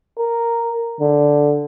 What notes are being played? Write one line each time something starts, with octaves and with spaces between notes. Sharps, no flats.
A#4
D3